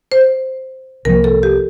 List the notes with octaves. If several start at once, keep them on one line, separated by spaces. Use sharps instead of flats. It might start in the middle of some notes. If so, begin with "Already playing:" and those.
C5
C2 C3 F3 A#3 A#4
A4
G4